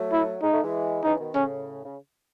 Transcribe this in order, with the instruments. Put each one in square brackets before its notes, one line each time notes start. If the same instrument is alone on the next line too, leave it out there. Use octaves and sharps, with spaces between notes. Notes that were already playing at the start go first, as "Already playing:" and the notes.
Already playing: [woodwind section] F#3 A3
[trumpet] E4
[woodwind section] G#3 [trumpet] D#4
[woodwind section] A3
E3 G#3
[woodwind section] C#3 E3 [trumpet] D#4
[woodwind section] B2 D#3
[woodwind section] A2 C#3 [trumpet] C#4
[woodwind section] C#3